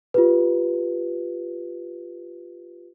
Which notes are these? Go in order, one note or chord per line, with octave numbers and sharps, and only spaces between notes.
F4 G4 B4